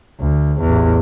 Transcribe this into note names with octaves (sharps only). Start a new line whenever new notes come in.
D2
A1 E2